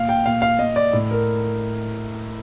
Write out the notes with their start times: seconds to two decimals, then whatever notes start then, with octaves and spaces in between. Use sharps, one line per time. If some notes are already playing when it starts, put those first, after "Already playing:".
Already playing: A#2 F5
0.09 G5
0.25 A#2 F5
0.42 F5
0.59 A#2 D#5
0.76 D5
0.93 A2
1.11 A#4